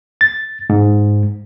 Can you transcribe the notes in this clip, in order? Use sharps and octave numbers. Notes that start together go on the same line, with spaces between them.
A6
G#2